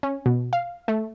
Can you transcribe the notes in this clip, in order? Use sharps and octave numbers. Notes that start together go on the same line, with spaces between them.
C#4
B2
F5
A3